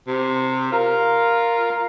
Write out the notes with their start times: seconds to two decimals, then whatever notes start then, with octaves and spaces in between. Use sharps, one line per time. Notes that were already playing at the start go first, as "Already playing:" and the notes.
0.07 C3
0.72 F4 A#4